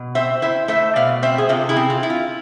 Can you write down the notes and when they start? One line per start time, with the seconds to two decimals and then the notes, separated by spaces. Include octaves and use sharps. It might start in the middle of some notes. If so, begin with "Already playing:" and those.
Already playing: B2
0.15 C4 C5 E5
0.42 E4 C5 E5
0.68 A3 C5 E5
0.96 B2 D5 F5
1.22 C4 C5 E5
1.38 G#4
1.49 C3 F4 A4
1.69 E4 G#4
1.76 C4
1.90 F4
2.03 E4
2.10 F4